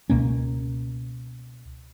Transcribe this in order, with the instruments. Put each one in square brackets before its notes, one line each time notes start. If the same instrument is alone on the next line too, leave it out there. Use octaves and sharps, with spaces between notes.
[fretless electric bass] C#2 B2 A#3 C#4